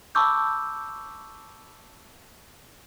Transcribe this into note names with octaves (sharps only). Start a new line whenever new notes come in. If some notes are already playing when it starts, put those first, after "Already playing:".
A5 B5 C#6 D6 E6 G6